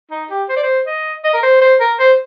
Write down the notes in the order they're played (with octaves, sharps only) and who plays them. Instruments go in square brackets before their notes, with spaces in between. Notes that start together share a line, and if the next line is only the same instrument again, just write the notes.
[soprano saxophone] D#4
G4
C5
D5
C5
D#5
D#5
A#4
C5
C5
A#4
C5